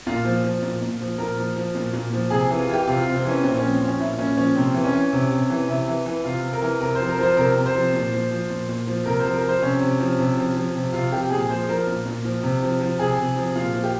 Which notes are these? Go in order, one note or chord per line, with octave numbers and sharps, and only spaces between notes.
A#2 F4
F3
F3
A#2
A#2
F3
A#2 A#4
F3
F3
A#2
A#2
F3
C3 G#4
E3
F4
E3 G4
C3 F4
F4
C3
C4
E3 C#4
A#2 C4
F3 C#4
C4
F3 C#4
A#2 E4
A#2 C#4
F3 C#4
C3 C4
E3
C#4
E3
C3
C3
E3
C3 E4
E3
E3
C3 F4
C3
A#4
E3
C3 A#4
F3 C5
A#4
F3 C5
C3 A#4
C3
C5
F3
A#2
F3
F3
A#2
A#2
F3
C3 A#4
C5
F3
A#4
F3
C5
C3 C#4
C3
F3
C3
F3
F3
C3
C3 F4
F3 G4
A#2 G#4
F3 C5
F3 A#4
A#2
A#2
F3
C3
F3
F3
C3 G#4
C3
F3
A#2 F4
F3
G4